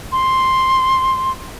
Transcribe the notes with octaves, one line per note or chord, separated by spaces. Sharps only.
C6